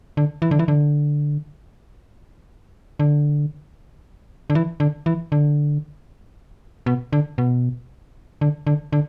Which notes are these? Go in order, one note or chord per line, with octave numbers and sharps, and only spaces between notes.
D3
E3
D3
E3
D3
D3
D3
E3
D3
E3
D3
B2
D3
B2
D3
D3
D3